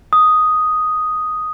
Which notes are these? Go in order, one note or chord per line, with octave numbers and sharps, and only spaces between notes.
D#6